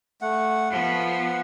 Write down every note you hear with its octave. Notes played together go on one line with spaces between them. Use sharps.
A3 F#5
F3 B3 F#5